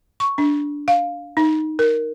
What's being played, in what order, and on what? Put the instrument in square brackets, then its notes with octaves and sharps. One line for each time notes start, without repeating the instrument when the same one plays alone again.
[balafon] C#6
D4
F5
D#4
A#4